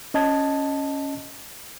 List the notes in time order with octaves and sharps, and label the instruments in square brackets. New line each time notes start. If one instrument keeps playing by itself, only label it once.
[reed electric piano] C#4 D#5 A5 G#6